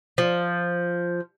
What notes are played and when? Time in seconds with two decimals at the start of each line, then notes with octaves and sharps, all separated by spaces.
0.18 F3